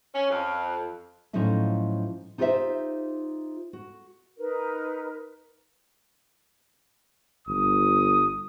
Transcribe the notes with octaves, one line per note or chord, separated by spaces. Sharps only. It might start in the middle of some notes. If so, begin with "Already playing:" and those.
C#4
F2
A2 F3 F#3 C#4 D#4 E4
D#4 F4 G4 B4 C5 E5
F#4
D#4 A#4 B4
G1 D#6